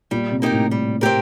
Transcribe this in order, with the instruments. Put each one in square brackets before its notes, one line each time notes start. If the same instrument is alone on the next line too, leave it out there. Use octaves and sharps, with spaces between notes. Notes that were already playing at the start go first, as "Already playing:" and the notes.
[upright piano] A#2 [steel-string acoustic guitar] G3
[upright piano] C3
[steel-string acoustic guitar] A#3 D#4 G4 A#4
[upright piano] A2
[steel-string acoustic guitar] G3
C4 G4 A#4